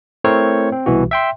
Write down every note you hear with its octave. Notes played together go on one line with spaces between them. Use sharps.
A3 C4 E4 A#4 C5 C#5
C4
C2 B2 E3 F#4
E5 G5 C6